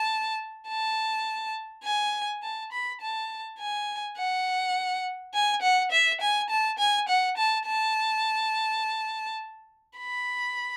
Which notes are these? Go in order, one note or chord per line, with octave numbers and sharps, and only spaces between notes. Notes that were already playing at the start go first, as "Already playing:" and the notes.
Already playing: A5
A5
G#5
A5
B5
A5
G#5
F#5
G#5
F#5
E5
G#5
A5
G#5
F#5
A5
A5
B5